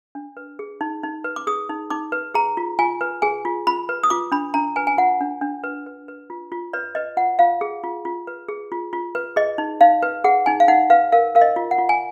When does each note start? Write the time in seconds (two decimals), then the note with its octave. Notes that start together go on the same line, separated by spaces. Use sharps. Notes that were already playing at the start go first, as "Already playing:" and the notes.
0.15 D4
0.37 B4
0.59 G#4
0.81 D#4
1.03 D#4
1.24 B4
1.36 D6
1.47 G#4 D#6
1.69 D#4
1.90 D#4 D6
2.12 B4
2.34 G#4 A#5
2.57 F4
2.79 F4 G#5
3.01 B4
3.22 G#4 G#5
3.45 F4
3.67 F4 B5
3.89 B4
4.03 D#6
4.10 F4 D6
4.32 D4 B5
4.54 D4 A#5
4.76 B4 G#5
4.87 G#5
4.98 F4 F#5
5.21 D4
5.41 D4
5.64 B4
5.86 B4
6.08 B4
6.30 F4
6.52 F4
6.73 B4 D5
6.95 B4 D#5
7.17 F4 F#5
7.39 F4 F5
7.61 G#4
7.84 F4
8.05 F4
8.27 B4
8.49 G#4
8.72 F4
8.93 F4
9.15 B4
9.36 G#4 D#5
9.58 D#4
9.81 D#4 F5
10.03 B4
10.24 G#4 F#5
10.46 D#4 G#5
10.60 F5
10.68 D#4 F#5
10.90 B4 F5
11.12 A#4 F5
11.35 A#4 F5
11.41 D#5
11.56 F4
11.71 F#5
11.78 F4
11.89 G#5